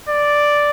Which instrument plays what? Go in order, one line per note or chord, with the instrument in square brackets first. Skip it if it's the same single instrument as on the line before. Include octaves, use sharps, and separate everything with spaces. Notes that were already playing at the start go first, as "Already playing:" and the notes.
[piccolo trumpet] D5